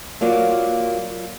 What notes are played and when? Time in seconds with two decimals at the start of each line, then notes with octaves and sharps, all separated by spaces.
0.21 F#3 A#3 F4 D5